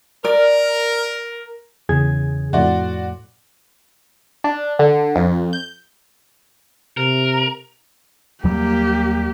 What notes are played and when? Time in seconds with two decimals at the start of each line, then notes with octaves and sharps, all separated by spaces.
0.25 A#4 D5
1.89 E2 C#3 G#4 G#6
2.53 F2 A2 F#4 D5 C6 A6
4.44 D4
4.79 D3
5.16 F2
5.53 G6
6.97 C3 A#4
8.44 D#2 F#3 G3 A#3 G4